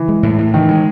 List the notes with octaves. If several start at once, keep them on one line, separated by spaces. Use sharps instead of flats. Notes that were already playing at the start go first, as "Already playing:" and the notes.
Already playing: E3
G#3
A2
A2
D#3 E3
G#3